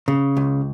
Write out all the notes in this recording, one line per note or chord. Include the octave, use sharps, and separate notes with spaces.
C#3
C#2